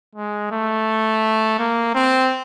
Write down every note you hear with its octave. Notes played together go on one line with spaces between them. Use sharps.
G#3
A3
A#3
C4